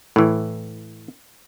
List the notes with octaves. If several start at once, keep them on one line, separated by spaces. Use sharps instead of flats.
A2 E3